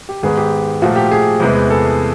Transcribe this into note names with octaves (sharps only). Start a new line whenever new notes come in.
G4
G#2 D#3 G#3 B3 G#4
G4
A#2 F3 A3 F#4
G4
G#4
E2 C3 E3 G#3 B3
A4